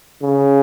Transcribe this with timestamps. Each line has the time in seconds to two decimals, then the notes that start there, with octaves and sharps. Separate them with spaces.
0.22 C#3